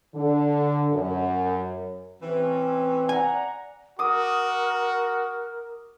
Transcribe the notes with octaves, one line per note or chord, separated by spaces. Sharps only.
D3
F#2
A2 C3 E3 C4 C#4 B4
D5 F#5 G#5 A#5
F#4 A#4 D6 D#6